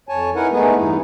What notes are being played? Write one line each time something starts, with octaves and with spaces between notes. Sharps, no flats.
F2 C#5 G#5 A5
D#4 E4 A#4 B4 F#5 G#5
G#3 A3 B3 D#4 G#4 B4
E2 G2 D#4 E4